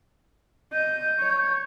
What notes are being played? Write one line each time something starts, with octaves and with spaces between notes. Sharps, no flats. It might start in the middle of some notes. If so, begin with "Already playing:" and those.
D#5 G6
C#5